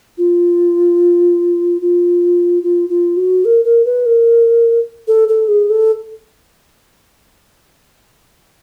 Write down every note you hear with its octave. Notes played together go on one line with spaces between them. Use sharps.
F4
F4
F4
F4
F#4
A#4
A#4
B4
A#4
A4
A4
G#4
A4